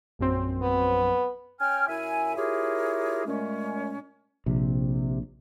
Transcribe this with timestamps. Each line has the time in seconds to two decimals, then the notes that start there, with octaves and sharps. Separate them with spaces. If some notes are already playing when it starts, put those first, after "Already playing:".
0.19 A#1 F#2 C4
0.62 B3
1.60 C#4 G5 G#5 F6
1.88 F#2 E4 E5 G#5
2.36 E4 F4 G4 G#4 A#4 C#5
3.26 A#2 G#3 A3 C#4
4.46 A#1 C3